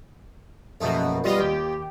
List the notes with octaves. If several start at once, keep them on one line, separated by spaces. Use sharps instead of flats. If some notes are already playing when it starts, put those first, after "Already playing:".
A#1 F#2 B2 A3 D#4
G3 B3 F4 F#4 D#5
D#2 G4